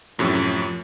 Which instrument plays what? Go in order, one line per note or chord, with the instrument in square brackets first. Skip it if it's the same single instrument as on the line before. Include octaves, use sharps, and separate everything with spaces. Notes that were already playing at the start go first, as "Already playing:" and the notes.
[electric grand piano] F#2 A2 C3 [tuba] F3